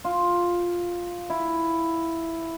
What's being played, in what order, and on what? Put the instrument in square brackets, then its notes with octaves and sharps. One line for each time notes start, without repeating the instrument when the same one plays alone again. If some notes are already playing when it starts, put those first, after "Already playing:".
[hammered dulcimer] F4
E4